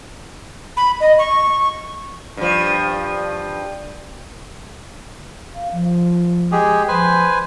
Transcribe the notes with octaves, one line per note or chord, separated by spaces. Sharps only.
B5
D#5
C#6
G2 F3
F5
F3
G#3 G4 G#4
F3 B4 C5 G#5